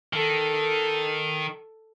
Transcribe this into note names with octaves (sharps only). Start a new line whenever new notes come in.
D#3 A4